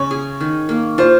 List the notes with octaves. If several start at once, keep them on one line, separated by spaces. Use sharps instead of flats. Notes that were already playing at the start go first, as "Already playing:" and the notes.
Already playing: C#3 C#4 C#5
G#4
D#3
A#3
F4 C5